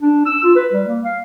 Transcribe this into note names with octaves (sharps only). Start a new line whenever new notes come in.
D4
E6
F4
B4
G3
A#3
F5